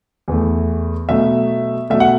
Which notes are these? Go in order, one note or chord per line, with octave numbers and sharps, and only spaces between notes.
E2 E3 A3
B2 F#3 A3 E5
B2 F#3 A3 E5
F#5